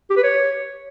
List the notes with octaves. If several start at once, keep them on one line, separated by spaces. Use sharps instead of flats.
G4
B4
C#5